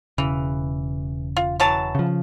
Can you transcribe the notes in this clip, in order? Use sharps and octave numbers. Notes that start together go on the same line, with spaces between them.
E1 C#3 E3
F4
E3 F#3 A5
C#3 F3